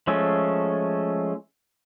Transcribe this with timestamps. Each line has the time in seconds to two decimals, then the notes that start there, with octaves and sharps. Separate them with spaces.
0.07 F3 G#3 A3 C#4 A4